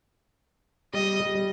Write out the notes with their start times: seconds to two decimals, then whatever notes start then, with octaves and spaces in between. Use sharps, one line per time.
0.93 G3 D#5
1.20 G3
1.35 G3